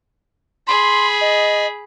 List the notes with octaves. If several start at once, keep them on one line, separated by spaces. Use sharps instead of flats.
G#4 B5 C6
D#5